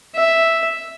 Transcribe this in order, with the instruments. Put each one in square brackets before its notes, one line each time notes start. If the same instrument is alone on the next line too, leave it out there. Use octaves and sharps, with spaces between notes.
[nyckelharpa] E5